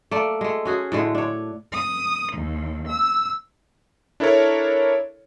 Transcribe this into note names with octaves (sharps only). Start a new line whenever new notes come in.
A3 A#3 D5
G#3 A3
C#4 F#4 G#4
A2 D3 G#3 A3
D4 C#5
D#6
D#2
E6
D4 E4 A4 A#4 C#5